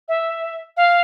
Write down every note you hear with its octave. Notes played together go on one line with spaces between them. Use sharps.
E5
F5